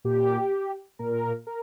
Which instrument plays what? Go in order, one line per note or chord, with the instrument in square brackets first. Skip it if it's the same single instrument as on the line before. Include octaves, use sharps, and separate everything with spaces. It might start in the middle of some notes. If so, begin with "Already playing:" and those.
[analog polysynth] A#2 G4
A#2 A#4
A#4